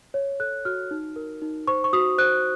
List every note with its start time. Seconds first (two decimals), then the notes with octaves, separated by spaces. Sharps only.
0.14 C#5
0.40 A4 F#6
0.65 F#4 F6
0.91 D#4
1.16 A#4
1.42 D#4
1.68 C5 C#6
1.84 C#6
1.93 F#4 D#6
2.18 C5 F#6